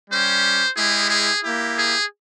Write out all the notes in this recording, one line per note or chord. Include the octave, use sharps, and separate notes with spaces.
G3 C#4 G4 C5
G#3 E4 G4 G#4
G#4
A#3 E4 G4
G#4